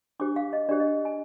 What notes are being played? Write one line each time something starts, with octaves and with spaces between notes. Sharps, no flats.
D4 G4 C5 D6
F5
D#5
D4 G4 C5 D5
D#5
G#5